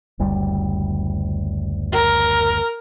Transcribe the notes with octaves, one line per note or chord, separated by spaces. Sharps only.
F#1 D2 G3
A#4